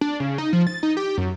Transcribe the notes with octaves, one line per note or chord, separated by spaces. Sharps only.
D4
C#3
D#4
F3
A6
D#4
G4
F#2